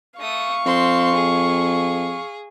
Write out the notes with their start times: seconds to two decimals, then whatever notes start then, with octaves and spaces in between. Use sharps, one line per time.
0.20 A3 F5 C#6 D#6
0.66 F2 C4 C6
1.15 G#4